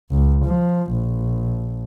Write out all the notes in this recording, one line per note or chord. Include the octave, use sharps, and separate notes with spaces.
C#2
F3
A#1